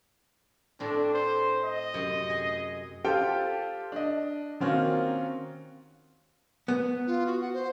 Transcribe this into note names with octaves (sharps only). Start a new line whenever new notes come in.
A2 C4 D4
C5
D#5
F#2 C3
G#4
F4 G4 A4 C5 G5
D4 D#5
D#3 A#3 C4 C#4 F4 F#4
B3
F4
F#4
F#5
C5